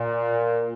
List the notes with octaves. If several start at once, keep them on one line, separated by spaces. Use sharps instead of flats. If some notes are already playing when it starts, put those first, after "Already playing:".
Already playing: A#2